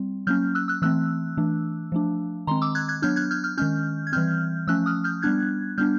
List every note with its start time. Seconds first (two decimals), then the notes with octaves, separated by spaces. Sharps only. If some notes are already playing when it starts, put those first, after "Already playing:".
Already playing: G3 C4
0.27 F#3 A#3 C#4 F6 G6
0.55 E6 F#6
0.68 E6 F#6
0.82 E3 A3 C4 E6 F#6
1.37 E3 A3 D4
1.92 F3 A3 D4
2.47 D#3 G#3 C4 A#5 C6
2.62 D6 E6
2.75 F#6 G#6
2.89 F#6 G#6
3.02 F#3 B3 D4 F6 G6
3.16 F#6 G#6
3.31 F6 G6
3.44 F6 G6
3.58 D#3 G#3 C#4 F6 G6
4.07 G#6
4.13 E3 G3 C4 F6 G6
4.67 F3 A3 C#4 E6 F#6
4.86 D#6 F6
5.04 F6 G6
5.23 G3 B3 D4 F#6 G#6
5.78 G3 B3 D4 F6 G6